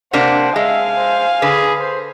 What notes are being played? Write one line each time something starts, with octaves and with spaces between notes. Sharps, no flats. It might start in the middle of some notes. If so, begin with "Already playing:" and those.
C3 A#3 D4 C5 F#5
G#3 E5 F5 G#5
C5
D3 G#4 B4
C5